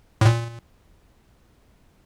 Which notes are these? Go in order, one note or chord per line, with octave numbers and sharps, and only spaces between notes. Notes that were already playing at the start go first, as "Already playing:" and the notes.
A2
A#2